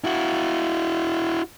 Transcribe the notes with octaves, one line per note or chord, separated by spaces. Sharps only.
E4 F#4